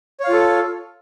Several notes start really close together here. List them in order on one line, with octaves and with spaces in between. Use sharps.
C#5 F5 F4 A4